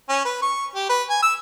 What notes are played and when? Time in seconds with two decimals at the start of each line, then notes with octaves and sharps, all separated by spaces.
0.09 C#4
0.25 B4
0.42 C#6
0.75 G4
0.89 B4
1.10 G#5
1.23 E6